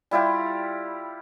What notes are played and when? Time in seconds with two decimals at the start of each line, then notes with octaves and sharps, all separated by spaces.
0.11 G3 E4 F4 G4